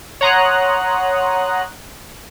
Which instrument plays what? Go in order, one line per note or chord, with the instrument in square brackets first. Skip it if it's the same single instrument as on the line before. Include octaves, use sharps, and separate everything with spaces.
[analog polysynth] C#5 F#5 A#5 C6 D#6 F#6